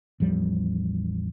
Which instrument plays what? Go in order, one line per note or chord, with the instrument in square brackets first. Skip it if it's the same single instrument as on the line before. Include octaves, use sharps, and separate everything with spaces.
[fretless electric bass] A1 E2 F3 G3